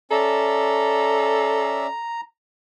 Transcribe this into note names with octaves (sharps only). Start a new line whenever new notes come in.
C#4 A4 D5 E5 A#5